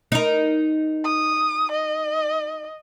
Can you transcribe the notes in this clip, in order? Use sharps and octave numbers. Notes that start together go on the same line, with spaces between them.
D#4 A#4
D#6
D#5